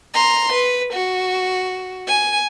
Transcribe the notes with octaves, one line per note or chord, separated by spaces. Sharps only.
A#5 C6
B4
F#4
G#5